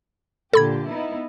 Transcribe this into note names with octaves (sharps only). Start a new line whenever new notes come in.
A#2 D3 G4 A4 B5 G#6
B3 D#4 E4